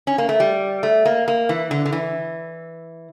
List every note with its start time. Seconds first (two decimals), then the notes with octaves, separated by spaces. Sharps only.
0.07 C#4
0.18 A#3
0.29 A3
0.40 G3
0.83 A3
1.05 A#3
1.28 A#3
1.49 E3
1.71 D3
1.86 D3
1.92 E3